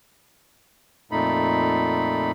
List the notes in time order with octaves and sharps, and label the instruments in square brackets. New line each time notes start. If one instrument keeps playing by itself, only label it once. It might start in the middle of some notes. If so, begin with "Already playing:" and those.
[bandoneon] F2 A#2 A3 D#4 B5